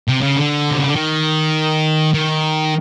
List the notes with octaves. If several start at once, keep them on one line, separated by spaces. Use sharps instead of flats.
C3
C#3
D3
C3
C#3
D3
D#3
D#3